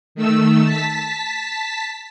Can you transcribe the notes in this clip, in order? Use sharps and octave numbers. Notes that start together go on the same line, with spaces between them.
D#3 A3 E6
A5 B6